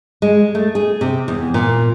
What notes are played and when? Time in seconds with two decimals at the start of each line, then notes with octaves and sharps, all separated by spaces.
0.22 G#3
0.55 A3
0.75 G#4
1.01 C3
1.28 E2
1.54 A#2